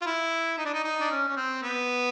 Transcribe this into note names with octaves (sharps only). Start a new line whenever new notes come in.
F4
E4
D#4
D4
D#4
D#4
D4
C#4
C#4
C4
B3